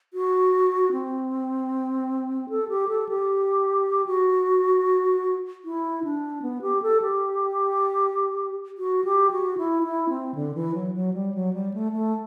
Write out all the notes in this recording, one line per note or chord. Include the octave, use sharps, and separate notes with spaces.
F#4
C4
A4
G4
A4
G4
F#4
E4
D4
B3
G4
A4
G4
F#4
G4
F#4
E4
E4
C4
D3
E3
F#3
F#3
G3
F#3
G3
A3
A3